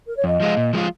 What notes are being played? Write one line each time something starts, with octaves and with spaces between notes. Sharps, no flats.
A#4
C#5
F2 D#5
F3 G#3 F4
A#2
F3 G#3 F4